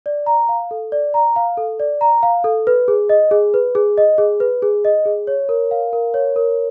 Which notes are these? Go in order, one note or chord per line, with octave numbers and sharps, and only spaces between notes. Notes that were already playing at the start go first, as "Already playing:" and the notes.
D5
A#5
F5
A4
D5
A#5
F5
A4
D5
A#5
F5
A4
B4
G#4
D#5
G#4
B4
G#4
D#5
G#4
B4
G#4
D#5
G#4
C#5
A#4
F5
A#4
C#5
A#4